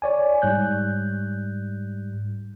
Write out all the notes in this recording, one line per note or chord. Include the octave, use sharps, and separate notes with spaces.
C#5 D5 G#5
G#2 G3 F#6 G6